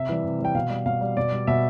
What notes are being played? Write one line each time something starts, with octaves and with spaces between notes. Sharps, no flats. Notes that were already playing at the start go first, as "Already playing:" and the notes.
Already playing: C3 E5
E3 G3
C3
E3 G3 G5
B2 F5
G3
B2 F5
G3
B2 D5
G3
B2 E5